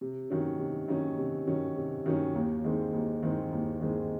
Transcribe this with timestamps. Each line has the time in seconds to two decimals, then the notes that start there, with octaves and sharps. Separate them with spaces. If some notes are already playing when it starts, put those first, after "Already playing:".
0.01 C3
0.30 D#3 F#3 C#4
0.59 C3
0.88 D#3 F#3 C#4
1.17 C3
1.47 D#3 F#3 C#4
1.76 C3
2.06 D#3 F#3 C#4
2.35 D#2
2.64 D#3 G#3 C4
2.93 D#2
3.23 D#3 G#3 C4
3.52 D#2
3.81 D#3 G#3 C4